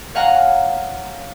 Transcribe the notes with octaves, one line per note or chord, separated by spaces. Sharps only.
C#5 F5 F#5 G#5 A#5